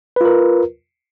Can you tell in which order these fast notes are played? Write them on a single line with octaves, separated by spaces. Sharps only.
B4 F4 A#4